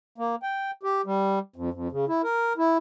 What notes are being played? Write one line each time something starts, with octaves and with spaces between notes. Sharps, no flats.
A#3
G5
G4
G3
F2
F2
C#3
E4
A#4
E4